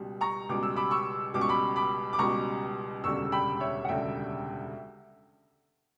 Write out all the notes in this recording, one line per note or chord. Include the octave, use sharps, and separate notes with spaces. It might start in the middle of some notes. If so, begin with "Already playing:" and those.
Already playing: C#2 B2 G3
A#5 C#6
C#2 B2 G3 D6
E6
B5 D6
C#6 E6
C#2 B2 G3 D6
C#6
B5 D6
B5 D6
D6
C#2 B2 G3 A#5 C#6
E1 D2 C#3 G3 C#6 E6
G5 B5
C#5 E5
F#5
E1 D2 C#3 G3 E5 G5